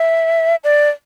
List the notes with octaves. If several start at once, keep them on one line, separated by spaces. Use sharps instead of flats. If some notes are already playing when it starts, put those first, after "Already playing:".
Already playing: E5
D5